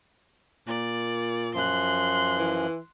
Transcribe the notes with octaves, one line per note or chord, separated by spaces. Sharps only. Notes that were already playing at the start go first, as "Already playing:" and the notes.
A#2 D5
F#2 F3 C6 F#6
E3